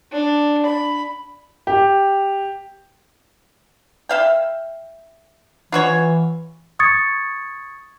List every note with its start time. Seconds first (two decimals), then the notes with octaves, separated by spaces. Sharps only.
0.12 D4
0.66 B5
1.67 G4
4.09 E5 F5 G5
5.72 E3 F4 F#4 C#5
6.79 C#6 D#6 G#6 A6 C#7